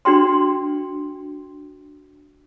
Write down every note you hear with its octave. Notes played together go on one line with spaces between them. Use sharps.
D4 F#4 G5 C6